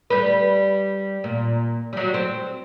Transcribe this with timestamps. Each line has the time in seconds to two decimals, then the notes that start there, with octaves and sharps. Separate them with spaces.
0.10 G3 B4
1.24 A#2
1.93 F#3 G3
2.14 C4